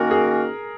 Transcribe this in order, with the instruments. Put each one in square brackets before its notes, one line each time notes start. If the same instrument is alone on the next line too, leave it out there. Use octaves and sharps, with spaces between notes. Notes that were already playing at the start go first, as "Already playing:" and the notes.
Already playing: [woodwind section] D#3 A#3 C#4 F#4 [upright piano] A#4
[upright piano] G#4